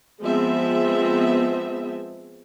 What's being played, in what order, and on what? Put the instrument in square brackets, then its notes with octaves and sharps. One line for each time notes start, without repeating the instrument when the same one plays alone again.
[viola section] F3 G#3 B3 C4 E5